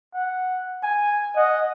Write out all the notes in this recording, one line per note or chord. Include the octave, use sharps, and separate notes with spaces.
F#5
G#5
D#5 F#5